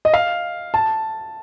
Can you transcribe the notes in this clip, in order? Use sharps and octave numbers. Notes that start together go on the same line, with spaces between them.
D#5
F5
A5